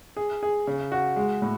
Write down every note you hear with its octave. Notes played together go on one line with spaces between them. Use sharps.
G#4
G#4
C#3
F#4
G#3
A2